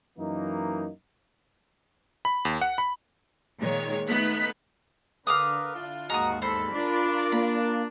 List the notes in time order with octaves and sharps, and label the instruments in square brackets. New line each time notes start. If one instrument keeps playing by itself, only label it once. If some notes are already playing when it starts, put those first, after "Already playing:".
[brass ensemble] F#2 E3 A#3 D#4
[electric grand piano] B5
D#2
F#5
B5
[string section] A#2 D#3 G#3 C#5
A3 B3 D#4 F#6 B6
[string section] D3 [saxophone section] A#4 B4 [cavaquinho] F5 D6 D#6
[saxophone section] D4 E4 F4
[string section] D#2 G#2 [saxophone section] F3 G#3 F#4 [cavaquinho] A#5 D#6
[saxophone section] E2 G2 A4 [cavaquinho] C5 [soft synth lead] B5
[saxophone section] D4 [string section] F4 A#4 D5
[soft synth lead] A#3 [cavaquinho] B5